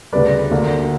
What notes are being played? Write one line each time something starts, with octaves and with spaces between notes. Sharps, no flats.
D2 C#3 G3 B4 D5
D2 D3 A#3